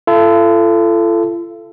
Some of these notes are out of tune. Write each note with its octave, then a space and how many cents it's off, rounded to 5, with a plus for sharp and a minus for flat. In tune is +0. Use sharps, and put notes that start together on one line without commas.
F4 -45 A4 +0